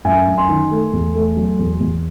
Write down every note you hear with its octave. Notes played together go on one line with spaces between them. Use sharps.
F#2 E5 G#5
F#2
G#5 C6
D#3
A3
E2
A3
F#3
E2
E2